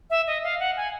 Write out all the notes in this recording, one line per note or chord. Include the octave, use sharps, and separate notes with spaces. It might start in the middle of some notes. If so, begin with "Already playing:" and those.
E5
D#5
F5
F#5
G#5